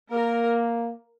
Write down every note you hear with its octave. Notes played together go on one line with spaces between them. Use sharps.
A#3 A#4